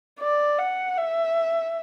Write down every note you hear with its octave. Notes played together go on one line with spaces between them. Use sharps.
D5
F#5
E5